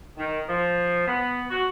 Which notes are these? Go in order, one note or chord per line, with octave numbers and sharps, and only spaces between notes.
D#3
F3
B3
F#4